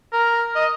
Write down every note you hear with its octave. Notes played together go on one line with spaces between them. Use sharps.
A#4
D#5